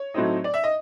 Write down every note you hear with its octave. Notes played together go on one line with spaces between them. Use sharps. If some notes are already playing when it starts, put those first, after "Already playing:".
Already playing: C#5
A2 F#3 A3 C4 D#4
D5
E5
D#5